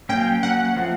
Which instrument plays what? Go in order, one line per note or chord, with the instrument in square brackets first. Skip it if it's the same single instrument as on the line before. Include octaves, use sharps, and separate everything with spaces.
[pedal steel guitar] F#3 A#3 C#4 [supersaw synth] G5
[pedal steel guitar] F#3 A#3 C#4 [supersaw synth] F#5
[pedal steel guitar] F3 A3 C4